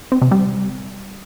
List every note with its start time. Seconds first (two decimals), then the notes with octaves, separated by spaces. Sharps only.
0.12 C4
0.22 C3
0.31 G3